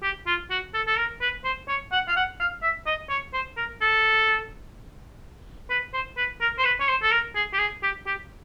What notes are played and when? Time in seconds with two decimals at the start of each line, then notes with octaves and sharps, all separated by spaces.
0.03 G4
0.27 F4
0.50 F#4
0.74 A4
0.87 A4
0.98 A#4
1.21 B4
1.45 C5
1.68 C#5
1.92 F#5
2.08 F5
2.16 F#5
2.40 F5
2.63 E5
2.86 D#5
3.10 C#5
3.33 C5
3.57 A#4
3.81 A4
5.70 B4
5.94 C5
6.17 B4
6.41 A#4
6.58 C5
6.65 B4
6.80 C#5
6.88 C5
7.02 A4
7.11 A#4
7.35 G#4
7.53 G4
7.59 G#4
7.83 G4
8.06 G4